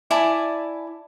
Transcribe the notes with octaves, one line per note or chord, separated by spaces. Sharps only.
E4 D5 G#5 A5